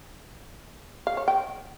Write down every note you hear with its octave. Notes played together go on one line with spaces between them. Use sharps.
F5
C#5
G5